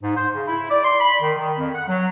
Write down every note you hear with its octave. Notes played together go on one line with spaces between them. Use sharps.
G#2
C5
C#3
E4
D5
C6
B5
D#3
D#3
F2
F#5
F#3